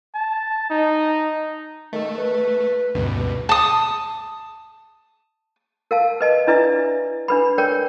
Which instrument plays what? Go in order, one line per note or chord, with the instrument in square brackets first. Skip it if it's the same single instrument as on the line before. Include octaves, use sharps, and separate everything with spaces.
[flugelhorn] A5
D#4
[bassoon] D#3 [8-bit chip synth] A3
[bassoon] B4
[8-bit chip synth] D2 G2 B2
[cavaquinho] A5 D#6
[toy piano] A#4 F5 A5
B4 D#5 A5
D4 E4 B4 D5 E5
D4 B4 B5
A#4 C#5 D5 G5